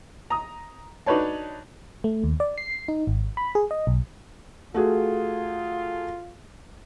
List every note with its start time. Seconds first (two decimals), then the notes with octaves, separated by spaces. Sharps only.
0.30 A#5 D#6
1.06 D4 D#4 F#4 B4 C#5 A5
2.04 A3
2.24 D#2
2.40 D5
2.58 C7
2.88 D#4
3.07 G#1
3.37 B5
3.55 G#4
3.71 D#5
3.87 B1
4.75 A3 F4 F#4 G#4